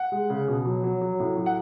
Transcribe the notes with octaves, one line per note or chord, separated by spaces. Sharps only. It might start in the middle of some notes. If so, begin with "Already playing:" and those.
Already playing: F#5
G#3
C#3
B2
F#3
F#3
F#3
A2
F#3
F#5